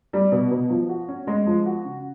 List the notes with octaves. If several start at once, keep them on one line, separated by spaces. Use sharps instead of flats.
G3
B2
B2
F3
F#4
C#4
G#3
F3
F#4
C#3